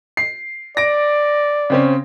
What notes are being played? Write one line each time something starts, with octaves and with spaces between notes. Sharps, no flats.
C7
D5 A#6 D7
C#3 C4 C#4